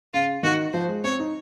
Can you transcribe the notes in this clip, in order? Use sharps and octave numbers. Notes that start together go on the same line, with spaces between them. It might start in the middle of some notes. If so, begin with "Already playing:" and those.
C#3 F4
D#3 F#4
F3 C5
G#3
C4 C#5
D#4